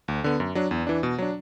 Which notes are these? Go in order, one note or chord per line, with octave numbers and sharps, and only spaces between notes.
D2
D3 B3
F#2
F#3 D4
E2
E3 D4
B2
F#3 D4